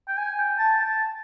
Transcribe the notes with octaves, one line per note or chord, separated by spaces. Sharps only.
G5
G#5
G5
A5
A5